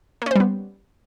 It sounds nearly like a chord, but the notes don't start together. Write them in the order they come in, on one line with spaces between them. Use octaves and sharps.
A#3 C#4 C5 G3 B3